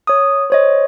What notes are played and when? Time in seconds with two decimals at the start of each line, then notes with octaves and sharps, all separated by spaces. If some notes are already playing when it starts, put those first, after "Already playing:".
0.07 C#5 D#6
0.50 C5 C#5 D#5